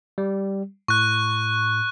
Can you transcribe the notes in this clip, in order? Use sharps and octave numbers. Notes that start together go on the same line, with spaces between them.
G3
A2 C#6 F#6